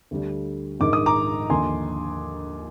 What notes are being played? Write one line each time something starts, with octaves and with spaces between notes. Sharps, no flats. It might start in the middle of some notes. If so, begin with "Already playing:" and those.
D2 D3 G3
A#1 G#2 D#3 D6
D#6
A#5 D6
D#2 D3 F3 G#5 C6